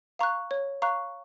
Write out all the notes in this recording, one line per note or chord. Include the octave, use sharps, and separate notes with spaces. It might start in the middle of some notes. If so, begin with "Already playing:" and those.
F5 A#5 C#6 F#6
C#5
F5 A#5 C#6 F#6